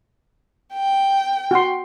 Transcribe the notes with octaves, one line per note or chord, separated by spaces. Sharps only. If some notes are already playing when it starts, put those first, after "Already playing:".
G5
F#4 C6